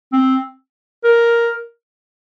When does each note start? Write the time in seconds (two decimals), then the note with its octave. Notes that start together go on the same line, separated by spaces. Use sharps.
0.13 C4
1.04 A#4